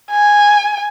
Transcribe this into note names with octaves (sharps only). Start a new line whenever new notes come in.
G#5